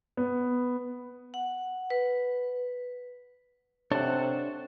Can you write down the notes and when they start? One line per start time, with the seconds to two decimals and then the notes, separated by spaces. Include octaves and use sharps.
0.17 B3
1.34 F#5
1.90 B4
3.92 C3 D4 A4 C5 C#5 F#5